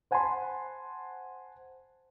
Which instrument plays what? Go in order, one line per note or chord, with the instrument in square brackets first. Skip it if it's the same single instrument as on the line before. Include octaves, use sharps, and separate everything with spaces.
[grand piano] C5 F#5 G#5 A5 B5 C6